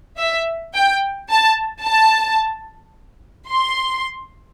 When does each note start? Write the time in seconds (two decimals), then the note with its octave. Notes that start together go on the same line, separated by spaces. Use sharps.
0.18 E5
0.74 G5
1.29 A5
1.84 A5
3.50 C6